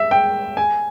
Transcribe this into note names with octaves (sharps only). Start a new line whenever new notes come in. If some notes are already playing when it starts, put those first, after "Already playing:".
Already playing: E5
G5
G#5